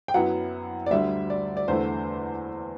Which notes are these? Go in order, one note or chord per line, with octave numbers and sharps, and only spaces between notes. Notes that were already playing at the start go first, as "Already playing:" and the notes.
G5
F#2 F#3 B3 E4 F#5
D5
D2 D3 G3 E5
D5
D5
E2 D3 A3 E4 C5